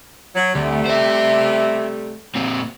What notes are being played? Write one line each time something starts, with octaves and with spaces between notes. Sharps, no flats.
F#3
D2 C3 G3 A3
C5 E5
A#2 C4